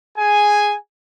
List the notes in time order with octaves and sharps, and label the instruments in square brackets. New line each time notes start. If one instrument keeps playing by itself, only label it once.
[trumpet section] G#4 G#5